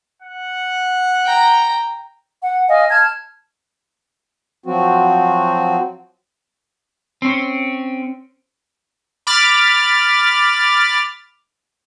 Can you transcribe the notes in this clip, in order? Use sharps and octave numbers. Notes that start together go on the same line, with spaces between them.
F#5
G5 A#5
F#5
D#5 F5 G#5
A5 F6 G#6
F3 F#3 C4 F#4
C4 C#4
B5 D6 F6 A6